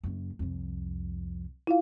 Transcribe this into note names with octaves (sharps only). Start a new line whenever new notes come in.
F#1 F#2
C2 F2
E4 F4 F5